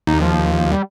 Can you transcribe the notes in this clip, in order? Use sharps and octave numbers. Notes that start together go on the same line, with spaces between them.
D#2 D#4
F3
G3